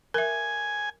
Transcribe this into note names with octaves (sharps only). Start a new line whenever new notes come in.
A#4 E5 G#5